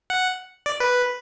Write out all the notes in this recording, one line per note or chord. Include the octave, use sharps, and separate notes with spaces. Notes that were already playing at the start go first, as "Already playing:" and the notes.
F#5
D5
B4